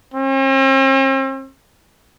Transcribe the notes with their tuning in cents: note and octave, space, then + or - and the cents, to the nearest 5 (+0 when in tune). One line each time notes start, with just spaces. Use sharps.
C4 +45